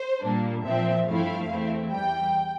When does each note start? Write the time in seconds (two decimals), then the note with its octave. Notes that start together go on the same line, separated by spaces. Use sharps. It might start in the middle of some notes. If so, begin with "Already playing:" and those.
Already playing: C5
0.22 A#2 G3 A#3 D4
0.64 A#2 F3 C4 E5
1.06 G2 F3 A3 C4 E4 F5
1.49 E2 E3 A3 C4 E4
1.92 E2 E3 G3 G5